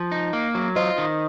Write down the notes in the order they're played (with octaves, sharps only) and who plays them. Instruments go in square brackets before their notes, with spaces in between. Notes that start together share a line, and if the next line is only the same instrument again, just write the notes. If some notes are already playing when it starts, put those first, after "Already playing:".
Already playing: [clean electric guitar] F3
D#4
A#3
F#3
[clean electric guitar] F4 [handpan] C5 D#5
[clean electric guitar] D#3